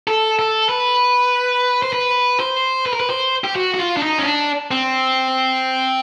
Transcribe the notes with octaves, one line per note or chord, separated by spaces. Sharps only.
A4
A4
B4
C5
B4
C5
B4
A#4
B4
C5
G4
F#4
F#4
F4
D4
D#4
C#4
D4
C4